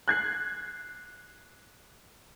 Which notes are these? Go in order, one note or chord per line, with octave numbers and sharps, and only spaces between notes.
F#6 G#6 C7